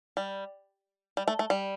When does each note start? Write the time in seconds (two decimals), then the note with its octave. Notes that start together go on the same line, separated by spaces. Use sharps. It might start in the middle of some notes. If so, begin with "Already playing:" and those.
0.17 G3
1.17 G3
1.28 A3
1.39 A3
1.50 G3